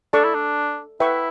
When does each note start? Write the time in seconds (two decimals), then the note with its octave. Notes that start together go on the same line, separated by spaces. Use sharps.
0.13 D4 A4 D5 A5 C#6
0.24 E4
0.35 D4
1.00 E4 B4 E5 G5 C#6